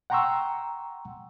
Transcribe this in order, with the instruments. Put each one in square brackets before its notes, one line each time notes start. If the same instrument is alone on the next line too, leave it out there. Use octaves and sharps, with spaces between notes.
[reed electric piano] F#5 G5 A#5 C6 C#6 E6